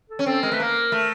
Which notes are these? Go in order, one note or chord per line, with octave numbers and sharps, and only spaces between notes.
A4
C#4
C4 A4
G#3 A#4
A3 B4
A#3 A#4
A3